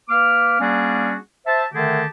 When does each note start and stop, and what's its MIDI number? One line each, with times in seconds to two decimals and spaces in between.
0.09 0.59 58
0.09 0.59 71
0.09 0.59 86
0.09 0.59 89
0.60 1.16 55
0.60 1.16 58
0.60 1.16 61
0.60 1.16 62
0.60 1.16 66
0.60 1.16 68
1.47 1.64 72
1.47 1.64 76
1.47 1.64 81
1.74 2.04 50
1.74 2.04 51
1.74 2.04 57
1.74 2.04 67
1.74 2.04 68
1.74 2.04 81